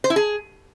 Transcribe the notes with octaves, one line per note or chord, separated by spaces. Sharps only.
C5
E4
G#4